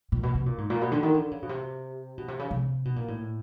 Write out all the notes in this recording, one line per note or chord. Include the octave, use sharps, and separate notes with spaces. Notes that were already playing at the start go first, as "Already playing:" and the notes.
A#2
B2
C3
A#2
G#2
A#2
B2
D3
D#3
D3
C#3
B2
C3
B2
C3
C#3
C3
B2
A#2
A2